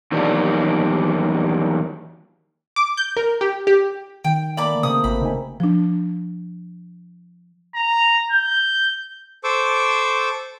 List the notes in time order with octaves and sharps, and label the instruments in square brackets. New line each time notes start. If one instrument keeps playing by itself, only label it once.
[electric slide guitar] E2 D#3 F#3 G3 A#3 D4
[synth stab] D6
G6
A#4
G4
G4
[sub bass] D#3 [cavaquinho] G5
[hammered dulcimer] A3 A#3 [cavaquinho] D5 B5 D6
[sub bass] C#3 [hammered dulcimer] C4 [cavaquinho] D#6
[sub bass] G#1 [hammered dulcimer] F#4 G4 E5 [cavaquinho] B5
[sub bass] C#3 [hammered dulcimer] D#4 G#5
[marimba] F3 D4
[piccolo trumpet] A#5
G6
[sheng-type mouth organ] A4 C5 C#6 D6 E6